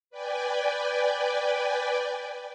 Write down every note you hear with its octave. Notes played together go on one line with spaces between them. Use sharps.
B4 D5 G5 G#5